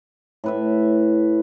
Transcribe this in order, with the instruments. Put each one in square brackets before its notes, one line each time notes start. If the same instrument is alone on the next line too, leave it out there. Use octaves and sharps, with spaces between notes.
[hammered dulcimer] A2 B4 E5